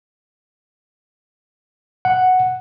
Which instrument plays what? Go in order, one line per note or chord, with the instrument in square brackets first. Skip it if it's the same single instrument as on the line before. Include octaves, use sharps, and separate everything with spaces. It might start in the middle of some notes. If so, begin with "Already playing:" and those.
[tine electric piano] F#5